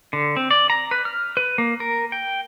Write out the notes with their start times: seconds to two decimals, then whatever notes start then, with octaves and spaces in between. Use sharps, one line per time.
0.13 D3
0.37 C4
0.51 D5
0.70 A#5
0.91 B4
1.05 F6
1.37 B4
1.58 A#3
1.80 A#4
2.12 G5